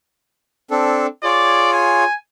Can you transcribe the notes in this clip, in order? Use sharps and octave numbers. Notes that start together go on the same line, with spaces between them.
C4 D4 A4
F4 G#4 C#5 D5
G#5